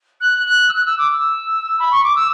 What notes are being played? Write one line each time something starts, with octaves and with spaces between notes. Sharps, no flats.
F#6
F#6
E6
F#6
E6
D6
E6
B5
C#6
D6
E6